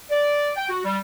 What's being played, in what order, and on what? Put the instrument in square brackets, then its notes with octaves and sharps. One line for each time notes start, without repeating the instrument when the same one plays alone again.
[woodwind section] D5
G5
F#4
G3